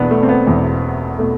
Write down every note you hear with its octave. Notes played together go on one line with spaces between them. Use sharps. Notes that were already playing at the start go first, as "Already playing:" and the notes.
Already playing: E1 E2 B2 B3 D4
A3
C4
B3
E1 E2 B2
B2 A3